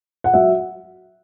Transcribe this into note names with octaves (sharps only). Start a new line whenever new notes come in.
F#5
F#3 E5